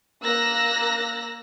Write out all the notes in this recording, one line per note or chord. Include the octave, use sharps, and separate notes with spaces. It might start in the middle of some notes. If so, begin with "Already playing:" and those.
A#3 A#5 E6 F#6 A#6